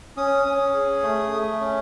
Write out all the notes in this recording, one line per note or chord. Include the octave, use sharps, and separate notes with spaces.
C#4 D#6
C#4
G#4
A3
A3
C#4